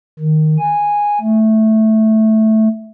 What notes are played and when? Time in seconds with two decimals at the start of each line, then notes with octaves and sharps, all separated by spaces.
0.19 D#3
0.59 G#5
1.21 A3